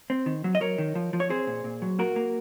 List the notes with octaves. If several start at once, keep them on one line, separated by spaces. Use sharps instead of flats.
C4
D#3
F#3
D#5
F#3 A#4 C#5
D#3
F3
F3
C#5
C4 G#4 C5
A#2
A#2
F#3
A#3 F#4 A#4
A#3